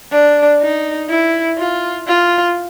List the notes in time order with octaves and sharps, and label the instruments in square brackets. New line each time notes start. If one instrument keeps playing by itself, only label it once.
[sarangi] D4
D#4
E4
F4
F4